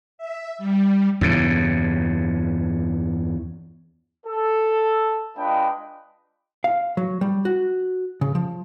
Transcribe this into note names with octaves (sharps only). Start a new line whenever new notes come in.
E5
G3
E2 G2 C#3
A4
G#3 D4 F4 B4 D#5 G5
F5
F#3
G3
F#4
C#3
F3